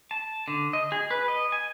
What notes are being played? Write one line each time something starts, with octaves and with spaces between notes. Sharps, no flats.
A5
D3
D#5
G#4
B4
D#5
G#5